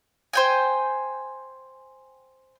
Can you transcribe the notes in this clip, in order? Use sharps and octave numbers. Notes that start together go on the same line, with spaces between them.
C5 G5 G#5